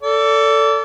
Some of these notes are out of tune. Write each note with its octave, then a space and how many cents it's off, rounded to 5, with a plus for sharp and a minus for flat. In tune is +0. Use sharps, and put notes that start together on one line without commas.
A4 +15 D5 -30